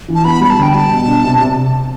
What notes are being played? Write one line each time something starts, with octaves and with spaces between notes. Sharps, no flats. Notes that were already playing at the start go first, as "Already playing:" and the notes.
E3
A5
B3 B5
G3 B5
A5
D3 G5
G3 A5
B2
D4
C3
C3